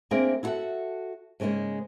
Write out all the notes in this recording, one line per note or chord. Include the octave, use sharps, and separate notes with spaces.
A#3 C4 D4 G#4 A#4 E5
E4 F#4 A4 A#4 E5 F#5
G#2 C#3 E3 G#3 A#3